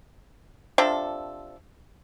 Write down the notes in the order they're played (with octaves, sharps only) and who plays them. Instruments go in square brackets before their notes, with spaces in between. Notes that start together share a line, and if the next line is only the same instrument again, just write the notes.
[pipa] C3 F3 D4 A4